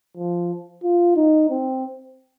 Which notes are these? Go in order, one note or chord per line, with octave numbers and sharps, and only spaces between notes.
F3
F4
D#4
C4